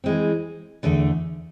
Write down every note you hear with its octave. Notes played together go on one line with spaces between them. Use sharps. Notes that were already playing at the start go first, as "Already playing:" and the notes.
E3 G#3 C4
E2 D3 A3